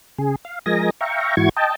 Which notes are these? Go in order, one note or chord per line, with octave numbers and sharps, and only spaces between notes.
C#3 G#4
F5
F3 G#3 A#4 D#5 G#5 A#6
E5 F5 G5 A#5 C#6
G#2 E3 E4 F#4 C#6 G#6
D#5 G5 A5